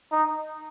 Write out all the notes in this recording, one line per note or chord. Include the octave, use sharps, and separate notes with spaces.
D#4